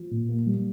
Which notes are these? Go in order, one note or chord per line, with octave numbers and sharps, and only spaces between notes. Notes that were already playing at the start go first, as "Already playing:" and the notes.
Already playing: F3
A#2
A#3
G3